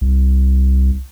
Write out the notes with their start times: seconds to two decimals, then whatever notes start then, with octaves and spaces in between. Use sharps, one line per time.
0.01 C2